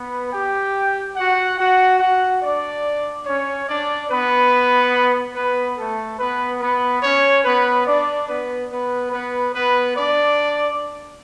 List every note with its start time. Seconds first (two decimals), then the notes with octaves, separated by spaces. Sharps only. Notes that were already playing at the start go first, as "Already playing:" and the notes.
Already playing: B3 B4
0.32 G4 G5
1.16 F#4 F#5
1.58 F#4 F#5
2.00 F#4 F#5
2.42 D4 D5
3.26 C#4 C#5
3.68 D4 D5
4.10 B3 B4
5.35 B3 B4
5.77 A3 A4
6.19 B3 B4
6.61 B3 B4
7.03 C#4 C#5
7.44 B3 B4
7.87 D4 D5
8.28 B3 B4
8.70 B3 B4
9.12 B3 B4
9.54 B3 B4
9.96 D4 D5